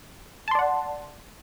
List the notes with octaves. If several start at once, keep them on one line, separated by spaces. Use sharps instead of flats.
D5 F#5 A5 C6